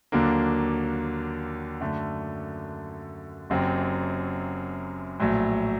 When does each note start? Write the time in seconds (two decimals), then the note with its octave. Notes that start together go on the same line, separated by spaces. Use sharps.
0.12 D#2 D3 F#3 A#3 D4
1.81 F#2 D3 A3
3.50 F#1 F#2 F#3 C4 G4
5.20 A#1 A2 F#3